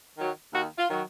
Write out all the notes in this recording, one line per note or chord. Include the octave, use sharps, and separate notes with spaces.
D#3 F#3
D#2 F#4
F4
D#3 F#3